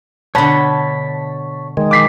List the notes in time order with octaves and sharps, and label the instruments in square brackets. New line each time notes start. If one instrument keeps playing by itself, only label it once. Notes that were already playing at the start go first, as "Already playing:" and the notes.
[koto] B2 D3 [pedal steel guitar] C#5 B5 [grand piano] A5
[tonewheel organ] D#3 G#3
[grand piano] D6 B6 C7